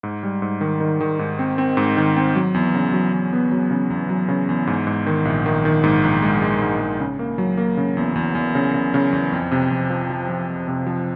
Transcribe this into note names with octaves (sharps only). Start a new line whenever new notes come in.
G#2
G3
G#2
D#3
D#3
D#3
G#2
C4
C4
G#2
D#3
C4
F#3
E2
C#3
F#3
E2
B3
F#3
C#3
E2
F#3
C#3
E2
G#2
G#2
D#3
A#1
D#3
D#3
G#2
A#1
G#3
G#3
G#2
G#2
C#3
A#3
F#3
A#3
C#3
E2
E2
E2
C#3
C#3
C#3
E2
F2
C3
F2
F3
F3
F3
F2
C3
F3